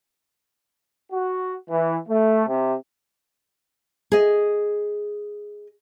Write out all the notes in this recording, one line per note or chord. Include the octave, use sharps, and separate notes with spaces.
F#4
E3
A3
C3
G#4 D#5